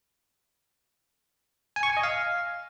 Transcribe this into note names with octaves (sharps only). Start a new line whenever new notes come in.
G#5
C#6
G#5
D#5
F5